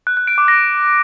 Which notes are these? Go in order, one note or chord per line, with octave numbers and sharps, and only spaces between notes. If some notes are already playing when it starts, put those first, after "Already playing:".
F#6
F#6
D7
D6
A#6